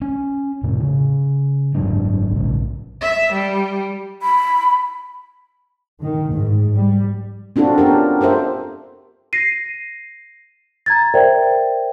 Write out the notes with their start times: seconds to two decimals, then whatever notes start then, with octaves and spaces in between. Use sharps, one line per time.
0.02 C#4
0.63 F2 A2 C3
0.80 C#3
1.75 F#1 G#2 F#3 D4
2.32 A#1 C#3
3.01 E5
3.32 G3
4.22 B5
6.01 D#3
6.31 G#2
6.73 G3
7.56 C4 D4 F4 F#4 A4
7.78 B3 C#4 G4 A#4
8.21 G4 A4 A#4 C5 E5
9.33 A#6 C7 D#7
10.86 A#5 G#6 A6
11.14 A#4 C5 D5 E5 G5